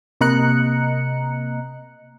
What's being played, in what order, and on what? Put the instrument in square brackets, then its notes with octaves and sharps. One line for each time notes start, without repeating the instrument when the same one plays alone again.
[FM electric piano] C3 A#3 D#5 A#5 F#6 C#7